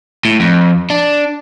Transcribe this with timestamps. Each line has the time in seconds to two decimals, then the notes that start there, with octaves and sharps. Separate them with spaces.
0.25 A2
0.40 F2
0.90 D4